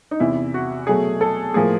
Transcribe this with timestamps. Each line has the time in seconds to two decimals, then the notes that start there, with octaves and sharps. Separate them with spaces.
0.11 D#4
0.20 E2 C3 E3 E4
0.54 F#4
0.87 B2 F#3 A3 G#4
1.21 A4
1.54 A2 F3 A#3 G#4